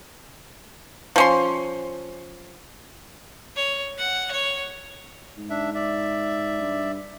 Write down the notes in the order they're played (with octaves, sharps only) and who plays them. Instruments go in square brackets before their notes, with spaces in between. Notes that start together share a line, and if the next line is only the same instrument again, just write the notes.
[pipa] F3 C#4 C6
[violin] C#5
F#5
C#5
[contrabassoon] G#2
[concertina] D4 E5
D5 E5
[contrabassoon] G2